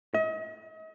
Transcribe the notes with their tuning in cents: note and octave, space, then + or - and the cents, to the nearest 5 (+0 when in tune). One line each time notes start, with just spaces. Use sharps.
D#5 +40